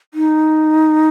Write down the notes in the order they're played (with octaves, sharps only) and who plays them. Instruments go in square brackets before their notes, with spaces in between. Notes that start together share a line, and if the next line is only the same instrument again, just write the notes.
[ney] D#4